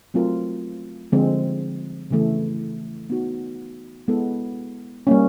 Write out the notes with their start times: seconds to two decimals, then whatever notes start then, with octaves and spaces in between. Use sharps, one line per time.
0.14 F#3 A3 C4 F4 A#4
1.12 D3 F3 G#3 C4
2.11 C#3 E3 A3
3.10 B3 D#4 F#4
4.08 G#3 B3 E4 A4
5.07 G3 A#3 C#4